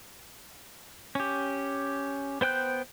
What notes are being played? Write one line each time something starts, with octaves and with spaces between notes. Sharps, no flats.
C#4 G4
B3 C5 G5 F#6 G6